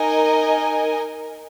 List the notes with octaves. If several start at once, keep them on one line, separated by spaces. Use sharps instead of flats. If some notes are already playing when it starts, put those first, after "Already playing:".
Already playing: D#4 A#4 D#5 G#5